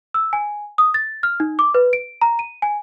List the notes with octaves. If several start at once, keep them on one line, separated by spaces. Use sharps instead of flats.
E6
G#5
D#6
A6
F6
D#4
D6
B4
D7
A#5
D#7
G#5